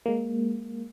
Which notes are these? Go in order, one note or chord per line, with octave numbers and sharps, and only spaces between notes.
G#3 A#3